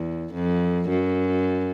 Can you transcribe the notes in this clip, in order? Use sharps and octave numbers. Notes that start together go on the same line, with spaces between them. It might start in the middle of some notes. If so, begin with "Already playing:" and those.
Already playing: E2
F2
F#2